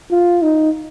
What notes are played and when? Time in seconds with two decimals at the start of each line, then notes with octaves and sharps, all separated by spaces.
0.11 F4
0.42 D#4